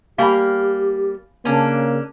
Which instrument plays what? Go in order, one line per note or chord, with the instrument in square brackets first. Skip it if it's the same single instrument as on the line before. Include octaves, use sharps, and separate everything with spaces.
[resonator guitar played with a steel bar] G3 A#3 [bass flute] G4 [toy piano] F5 G#5 B5
[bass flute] C#3 [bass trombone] A#3 [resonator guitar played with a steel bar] C#4 D4